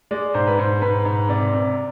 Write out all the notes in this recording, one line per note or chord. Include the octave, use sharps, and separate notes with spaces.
G#3 D5
G#2 C5
B4
G#2 C5
G#2 B4
G#2
C3 D5
C3